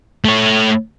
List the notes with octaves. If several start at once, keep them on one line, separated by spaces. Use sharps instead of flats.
A3 C#5